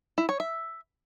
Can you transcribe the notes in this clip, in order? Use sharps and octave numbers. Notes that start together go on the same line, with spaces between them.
E4
C#5
E5